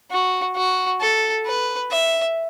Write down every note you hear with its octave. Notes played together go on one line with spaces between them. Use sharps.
F#4
F#4
A4
B4
E5